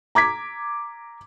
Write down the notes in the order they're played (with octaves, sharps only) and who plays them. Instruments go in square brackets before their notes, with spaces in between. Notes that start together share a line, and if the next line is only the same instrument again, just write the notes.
[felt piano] A#5 D6 G#6 B6